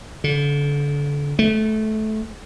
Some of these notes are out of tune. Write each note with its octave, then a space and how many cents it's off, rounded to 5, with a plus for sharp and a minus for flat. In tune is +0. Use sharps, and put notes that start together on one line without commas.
D3 -30
A3 -20